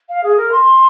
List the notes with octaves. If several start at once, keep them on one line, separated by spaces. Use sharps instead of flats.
F5
G#4
A#4
C6